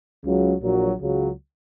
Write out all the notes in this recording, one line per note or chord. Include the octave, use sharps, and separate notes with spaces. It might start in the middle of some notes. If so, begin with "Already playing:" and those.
C#2 C#3 F#3
A#1 A#2 F#3
C#2 C#3 F#3